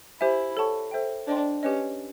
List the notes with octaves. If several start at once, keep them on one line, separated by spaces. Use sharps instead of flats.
E4 G4 C5 E5 G#5
A4 C#5 F#5 A5 C#6
A4 C5 E5 G5
D4 C5 D#5 G5 C6
C#4 G4 B4 D#5